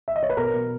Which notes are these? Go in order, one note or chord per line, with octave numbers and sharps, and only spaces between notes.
E5
D#5
C#5
B4
B2 A#4
B2